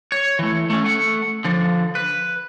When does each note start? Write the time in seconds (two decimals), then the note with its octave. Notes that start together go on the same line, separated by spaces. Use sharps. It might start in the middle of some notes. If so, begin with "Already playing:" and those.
0.12 C#5
0.39 E3 A3
0.70 A3 C#4
0.84 A3 F#5
1.45 D3 F3
1.95 B4